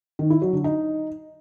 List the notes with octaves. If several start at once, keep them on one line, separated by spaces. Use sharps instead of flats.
D#3
E4
F#3
D3
D#4